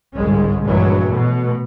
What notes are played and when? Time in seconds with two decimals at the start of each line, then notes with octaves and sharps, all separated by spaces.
0.14 G1 C2 G#2 G3 G#3 C#4
0.63 A#1 G2 E3 F#3 G#3
1.09 B2 A3